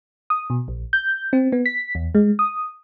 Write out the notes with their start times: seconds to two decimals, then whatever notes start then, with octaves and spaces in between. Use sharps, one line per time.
0.30 D#6
0.50 B2
0.68 A#1
0.93 G6
1.33 C4
1.52 B3
1.66 B6
1.95 E2
2.15 G#3
2.39 D#6